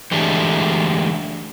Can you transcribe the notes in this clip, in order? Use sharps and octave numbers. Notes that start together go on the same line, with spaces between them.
D3 E3 G#3 A3 D4 G4